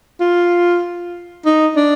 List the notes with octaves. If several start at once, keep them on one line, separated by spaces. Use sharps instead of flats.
F4
D#4
D4